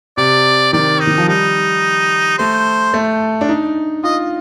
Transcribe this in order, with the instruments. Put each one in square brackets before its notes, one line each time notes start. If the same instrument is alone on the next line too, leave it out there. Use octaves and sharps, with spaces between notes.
[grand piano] C3 [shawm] D5
[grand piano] D#3 [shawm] D5
[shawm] D#4
[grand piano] D#3
F3
[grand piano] G3 [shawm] D#4
[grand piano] A3 [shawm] C5
[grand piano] A3
D4
D#4
[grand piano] F4 [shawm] D#5